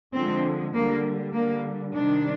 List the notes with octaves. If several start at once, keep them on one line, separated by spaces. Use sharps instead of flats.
D3 F3 G#3 C4
D3 G3 A#3
D3 G3 A#3
C3 D#3 G3 D4